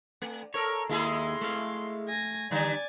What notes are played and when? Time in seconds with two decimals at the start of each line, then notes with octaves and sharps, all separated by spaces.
0.22 A3
0.54 A4 A#4 C#5
0.89 D#2 D#3 G#3 E4 G#4 C6
1.41 A3 F5
2.08 G#5 A#6
2.51 D3 G3 D5 G#5